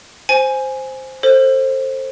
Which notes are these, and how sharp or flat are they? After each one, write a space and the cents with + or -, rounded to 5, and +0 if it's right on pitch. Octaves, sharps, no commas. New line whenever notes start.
C5 +0 G#5 +0
A4 +25 C5 +20